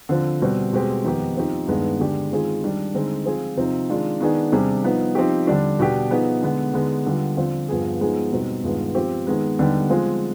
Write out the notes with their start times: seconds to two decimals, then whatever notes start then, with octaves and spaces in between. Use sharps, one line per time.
0.09 D3 F3 C4
0.42 B2 G3 C4
0.73 B2 G#3 C4 G4
1.04 F2 D#3 B3 D#4 G4
1.37 F3 C4 D#4 G4
1.67 G2 D#3 G#3 B3 D4
2.00 D3 G#3 D4 G4
2.32 D#3 G#3 C4 F4 G#4
2.63 D#3 G3 D4
2.94 D3 G#3 C4 D#4
3.25 F3 C4 F4 G#4
3.57 C3 F3 C4 D#4
3.90 D#3 G#3 D4 F4
4.20 D#3 B3 D4 G#4
4.52 C3 G3 D4 G#4
4.84 F3 B3 D#4
5.15 F3 C4 D#4 G4
5.47 D3 G3 D4
5.79 B2 B3 D4 G4
6.10 F3 B3 D#4 G#4
6.42 D3 G#3 B3
6.73 D3 G#3 B3 D#4
7.06 D3 G3 B3 F4
7.37 D3 F3 C4 F4
7.69 G2 F3 B3 F4 G#4
8.01 F3 G#3 B3 D#4 G#4
8.32 B2 G3 C4 D#4
8.63 G2 D#3 G#3 B3 F4
8.95 F3 C4 G4
9.27 D#3 G#3 B3
9.59 D3 G3 B3 D#4 G4
9.90 F3 G#3 C4 F4 G#4